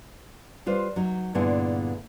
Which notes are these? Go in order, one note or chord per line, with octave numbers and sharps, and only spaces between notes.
G3 F4 B4 C5
F#3 D#4
G2 A#2 D3 B3 E4 G#4